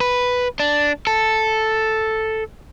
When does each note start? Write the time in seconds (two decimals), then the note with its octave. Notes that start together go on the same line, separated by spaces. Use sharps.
0.01 B4
0.60 D4
1.07 A4